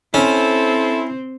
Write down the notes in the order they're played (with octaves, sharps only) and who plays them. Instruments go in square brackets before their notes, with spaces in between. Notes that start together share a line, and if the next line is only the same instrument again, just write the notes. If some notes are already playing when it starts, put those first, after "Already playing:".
[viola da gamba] C4 C5 [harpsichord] C#4 [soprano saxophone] E4 [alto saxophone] A4